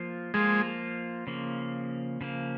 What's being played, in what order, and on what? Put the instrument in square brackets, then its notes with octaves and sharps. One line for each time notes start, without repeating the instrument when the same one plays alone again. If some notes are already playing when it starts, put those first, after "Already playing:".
Already playing: [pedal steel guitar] F3 A#3 F4
[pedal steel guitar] F3 A#3 F4 [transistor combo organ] G#3
[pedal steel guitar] C#3 F3 A#3
C#3 F3 A#3